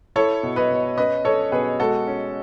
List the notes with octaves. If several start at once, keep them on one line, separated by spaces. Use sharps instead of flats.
E4 A4 C#5
B2
B4 D#5
B2
C#4 B4 D#5
C#4 A4 C#5
B2 G#4 B4
G#3 F#4 A4
C#4